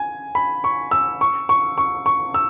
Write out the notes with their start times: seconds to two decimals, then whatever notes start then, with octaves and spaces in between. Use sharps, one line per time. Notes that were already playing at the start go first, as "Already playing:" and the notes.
Already playing: G#5
0.35 B5
0.64 C#6
0.91 E6
1.21 C#6
1.49 C#6
1.78 C#6
2.06 C#6
2.34 E6